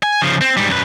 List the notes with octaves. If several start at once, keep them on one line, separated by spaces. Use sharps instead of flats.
G#5
C#3 F3
C4
G#2 G3
F#2 B4